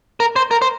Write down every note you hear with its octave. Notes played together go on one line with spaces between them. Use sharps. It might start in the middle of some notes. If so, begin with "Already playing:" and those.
A#4
C5
A#4
C5